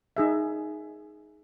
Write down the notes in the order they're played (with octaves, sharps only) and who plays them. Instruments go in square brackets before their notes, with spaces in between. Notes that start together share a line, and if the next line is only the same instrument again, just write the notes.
[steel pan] D#4 G#4 E5